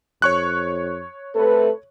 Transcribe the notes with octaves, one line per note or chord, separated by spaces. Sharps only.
F2 C#5 C#6 F#6
C3 A3 A4 B4